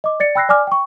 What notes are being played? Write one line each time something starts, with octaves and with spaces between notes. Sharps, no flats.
D#5 D6
D5 A6 C#7
G5 B5 E6 F#6 A#6 C7
D5 G#5 D6 F6
G5 C#6